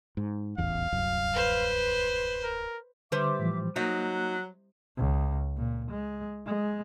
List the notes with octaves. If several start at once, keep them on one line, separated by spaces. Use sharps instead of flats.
G#2
D#1 A1 E2 F5
D1 C2 F#2
B4 C5
A#4
D3 G3 B4 C5 E5 D6
A2 E3 F3
F#3 A#3 D#4 F#6
C#2
A#2
G#3
G#3